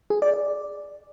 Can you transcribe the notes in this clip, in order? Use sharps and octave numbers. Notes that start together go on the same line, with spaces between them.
G#4
D5
D5